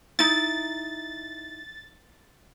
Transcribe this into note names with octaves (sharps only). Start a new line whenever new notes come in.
D#4 E4 A6